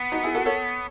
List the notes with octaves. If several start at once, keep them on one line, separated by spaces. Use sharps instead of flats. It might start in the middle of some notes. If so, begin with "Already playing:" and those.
Already playing: B3
D#4 F#4
E4 G#4
F#4 A4
A4 C#5